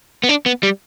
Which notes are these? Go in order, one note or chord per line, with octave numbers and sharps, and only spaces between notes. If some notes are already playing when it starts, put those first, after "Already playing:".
B3
D4
B3
G3